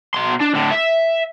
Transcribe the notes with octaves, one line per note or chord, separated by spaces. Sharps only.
B2 C6
D4
A2 D3
E5